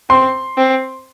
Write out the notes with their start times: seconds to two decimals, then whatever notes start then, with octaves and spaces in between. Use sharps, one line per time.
0.10 C4 C6
0.57 C4